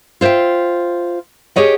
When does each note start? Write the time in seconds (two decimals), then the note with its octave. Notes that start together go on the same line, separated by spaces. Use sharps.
0.21 F4 C5 D5 E5 G5
1.56 G4 G#4 C#5 D#5 F#5